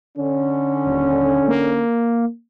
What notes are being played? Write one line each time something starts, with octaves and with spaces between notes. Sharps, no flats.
D3 C#4
D#1
A#3